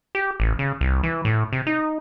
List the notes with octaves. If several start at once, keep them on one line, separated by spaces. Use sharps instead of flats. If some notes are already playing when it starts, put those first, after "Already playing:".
G4
A1
C#3
C2
E3
A2
C3
D#4